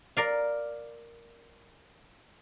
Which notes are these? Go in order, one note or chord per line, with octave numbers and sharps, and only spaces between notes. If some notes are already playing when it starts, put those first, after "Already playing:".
A#4 D5 F5